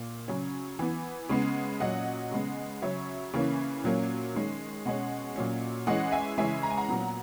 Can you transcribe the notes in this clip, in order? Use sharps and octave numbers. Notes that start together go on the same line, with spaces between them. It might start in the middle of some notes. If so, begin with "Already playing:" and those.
Already playing: A#2 A#3
C#3 F#3 C#4
E3 B3
C#3 G#3 B3
A#2 F#3 C#4 D#5 F#5
C#3 G#3 B3
C#3 F#3 C#4 C#5 E5
C#3 E3 A#3 C#4
A#2 F#3 A#3 C#4
D#3 G#3 C#4
B2 G#3 C#4 D#5 F#5
A#2 F#3 C#4
E3 G#3 C#4 D#5 F#5
E5 G#5
C#3 E3 G#3 C#4 E5 G#5
A#5
G#5
F#5 A#5
A#2 F#3 B3